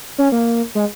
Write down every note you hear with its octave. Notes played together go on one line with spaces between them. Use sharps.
C#4
A#3
G#3